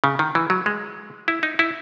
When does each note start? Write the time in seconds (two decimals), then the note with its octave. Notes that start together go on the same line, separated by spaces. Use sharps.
0.04 C#3
0.19 D#3
0.35 E3
0.50 F#3
0.66 G#3
1.28 E4
1.43 D#4
1.59 E4